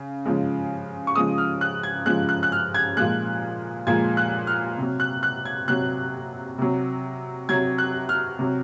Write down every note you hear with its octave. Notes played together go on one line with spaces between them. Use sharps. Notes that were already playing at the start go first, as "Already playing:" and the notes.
Already playing: C#3
C#3 F3 G#3
C#6
C#3 F3 G#3 D#6
F6
F#6
G#6
C#3 F3 G#3 F#6
F#6
F#6
F6
G#6
A#2 F3 G#3 F#6
A#2 F3 G#3 G#6
F#6
F6
C3 F#3
F#6
F#6
G#6
C3 F#3 F#6
C3 F#3
C3 F#3 G#6
F#6
F6
C3 F#3